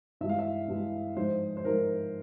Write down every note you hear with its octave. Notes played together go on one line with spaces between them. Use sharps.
G2 E3 G#3 E5
F5
E5
G2 E3 G#3
G#2 F3 G#3 C5
C5
G#2 F3 G#3 A#4